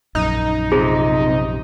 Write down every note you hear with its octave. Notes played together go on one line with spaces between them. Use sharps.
A#1 F#2 D#4
C3 F4 G#4 C5